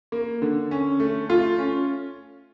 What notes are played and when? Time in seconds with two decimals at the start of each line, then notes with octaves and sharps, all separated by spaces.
0.12 A#3
0.42 D3
0.71 C#4
1.00 A3
1.29 A3 F4
1.58 C#4